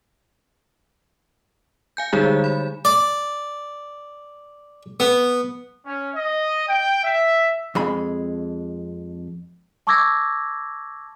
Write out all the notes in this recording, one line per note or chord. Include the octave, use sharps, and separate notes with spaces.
F5 G#5 G6
D3 G3 G#3 D#4 G#4
B5
D5
B3
C#4
D#5
G5
E5
F2 G#3 B5
A5 C#6 D6 E6 G#6 A#6